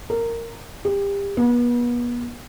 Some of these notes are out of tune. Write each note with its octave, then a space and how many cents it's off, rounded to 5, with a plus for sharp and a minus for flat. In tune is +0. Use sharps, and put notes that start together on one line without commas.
A#4 -15
G4 +30
B3 -35